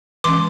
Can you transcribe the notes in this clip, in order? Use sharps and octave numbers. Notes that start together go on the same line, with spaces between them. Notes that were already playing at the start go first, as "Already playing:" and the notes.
E3 G#3 C#4 C6 D6